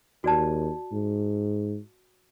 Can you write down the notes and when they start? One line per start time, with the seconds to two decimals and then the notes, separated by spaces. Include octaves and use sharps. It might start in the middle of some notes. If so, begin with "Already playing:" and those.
0.24 D#2 F#4 D5 A5
0.92 G#2